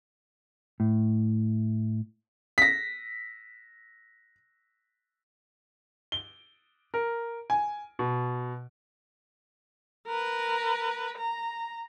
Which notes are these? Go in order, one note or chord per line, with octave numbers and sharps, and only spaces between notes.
A2
A#6 B6
G7
A#4
G#5
B2
A#4 B4
A#5